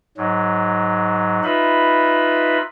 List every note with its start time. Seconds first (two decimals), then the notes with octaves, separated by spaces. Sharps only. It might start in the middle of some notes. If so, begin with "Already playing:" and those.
0.17 G#2 F#3
1.44 D#4 F4 B4 E5 B5